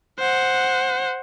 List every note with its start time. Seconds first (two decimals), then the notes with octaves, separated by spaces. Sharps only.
0.19 C5 F#5